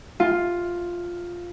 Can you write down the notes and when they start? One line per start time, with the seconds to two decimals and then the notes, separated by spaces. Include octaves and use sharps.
0.20 F4